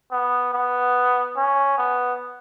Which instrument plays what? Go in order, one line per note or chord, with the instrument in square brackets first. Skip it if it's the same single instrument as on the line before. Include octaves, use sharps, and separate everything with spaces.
[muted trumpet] B3
B3
C#4
B3